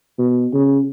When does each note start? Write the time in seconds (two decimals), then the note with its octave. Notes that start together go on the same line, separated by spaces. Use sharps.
0.19 B2
0.53 C#3